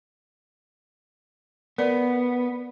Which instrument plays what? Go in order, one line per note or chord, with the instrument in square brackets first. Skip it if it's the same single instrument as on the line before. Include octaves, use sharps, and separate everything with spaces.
[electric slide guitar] B3 [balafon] A#4 D5